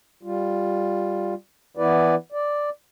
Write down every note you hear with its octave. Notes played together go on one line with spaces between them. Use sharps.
G3 F4
E3 B3 E4 B4 D5
D5